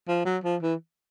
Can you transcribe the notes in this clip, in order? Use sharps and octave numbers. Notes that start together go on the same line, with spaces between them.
F3
F#3
F3
E3